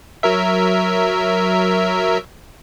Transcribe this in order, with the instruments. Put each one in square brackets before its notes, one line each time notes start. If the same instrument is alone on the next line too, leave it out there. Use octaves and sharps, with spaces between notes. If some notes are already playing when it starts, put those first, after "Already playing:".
[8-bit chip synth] F#3 A#4 E5